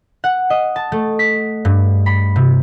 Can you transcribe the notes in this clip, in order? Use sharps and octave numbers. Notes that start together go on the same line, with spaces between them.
F#5
D#5
A5
A3
B6
G2
B5
C3